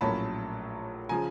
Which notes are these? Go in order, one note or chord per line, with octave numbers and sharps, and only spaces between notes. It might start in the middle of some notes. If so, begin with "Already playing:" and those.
A#1 A2 F#3 A#3 C#4 A5 B5
C#3 F3 G#5 A#5